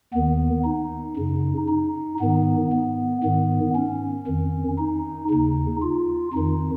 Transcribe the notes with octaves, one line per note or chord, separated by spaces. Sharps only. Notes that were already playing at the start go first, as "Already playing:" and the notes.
D#2 D#3 B3
D#4
F#2 C#3
D#4
G#2 D#3 B3
B3
G#2 D#3 B3
C#4
F2 D#3
D#4
D#2 C#3 D#4
F4
F2 D#3 D#4